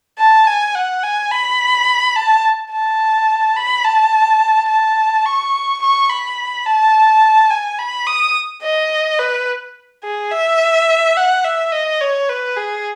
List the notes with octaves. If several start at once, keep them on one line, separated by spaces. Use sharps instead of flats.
A5
G#5
F#5
G#5
B5
A5
A5
B5
A5
A5
C#6
C#6
B5
A5
G#5
B5
D#6
D#5
B4
G#4
E5
F#5
E5
D#5
C#5
B4
G#4